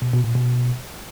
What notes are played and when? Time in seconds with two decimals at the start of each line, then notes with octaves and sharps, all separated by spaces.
0.02 B2
0.13 B2
0.24 A#2
0.35 B2